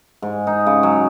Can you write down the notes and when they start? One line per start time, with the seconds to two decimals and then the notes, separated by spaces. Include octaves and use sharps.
0.22 G#2
0.47 D#4
0.67 C#3
0.83 F#3